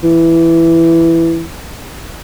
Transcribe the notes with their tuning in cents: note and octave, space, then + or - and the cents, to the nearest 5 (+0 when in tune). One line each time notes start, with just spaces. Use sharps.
E3 +5